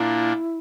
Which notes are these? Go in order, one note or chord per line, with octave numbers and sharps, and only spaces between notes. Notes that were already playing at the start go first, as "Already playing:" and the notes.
Already playing: A#2 A#3 D4 E4